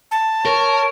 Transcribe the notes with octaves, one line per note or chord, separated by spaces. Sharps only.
A5
A#4 C#5